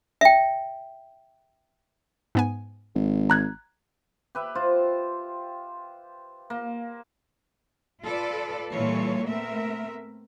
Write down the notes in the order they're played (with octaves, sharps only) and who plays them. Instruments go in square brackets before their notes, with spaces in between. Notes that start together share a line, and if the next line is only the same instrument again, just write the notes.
[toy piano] E5 G5
[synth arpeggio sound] G#2 B3 G#5
[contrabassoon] G#1
[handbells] A#5 F#6 G#6
[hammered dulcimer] G4 B4 E5
F4 C5
A#3
[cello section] F4 A4 B4 D5
A#2 E3 G3 F4 A4 C#5
A3 B3 C4 A#4 E5